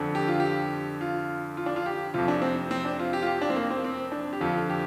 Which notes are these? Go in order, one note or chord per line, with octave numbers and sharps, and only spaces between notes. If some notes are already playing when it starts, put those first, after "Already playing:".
Already playing: F2 D3
G4
F4
G4
F4
F4
D4
F4
G4
F2 C3 F4
D4
C4
C4
D4
F4
G4
F4
G4
D4
C4
A#3
C4
C4
D4
G4
F2 D3 F4
G4